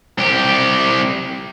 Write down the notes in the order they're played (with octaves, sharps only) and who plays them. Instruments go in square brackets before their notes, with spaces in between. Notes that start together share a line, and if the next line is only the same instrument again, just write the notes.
[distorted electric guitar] C2 G4